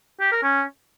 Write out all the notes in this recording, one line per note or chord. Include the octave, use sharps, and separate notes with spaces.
G4
A#4
C#4